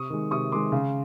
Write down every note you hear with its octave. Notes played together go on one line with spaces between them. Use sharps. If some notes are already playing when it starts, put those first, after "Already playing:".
Already playing: C3 C#6 D#6
D#3 G#3
C3 C#6 D#6
D#3 G#3 C6 D6
C#3